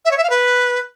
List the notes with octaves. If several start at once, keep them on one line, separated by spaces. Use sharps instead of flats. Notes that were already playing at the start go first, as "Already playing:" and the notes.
E5
C#5
E5
F5
B4